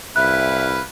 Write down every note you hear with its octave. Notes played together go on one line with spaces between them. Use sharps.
C2 E4 B4 E5 F5 F#6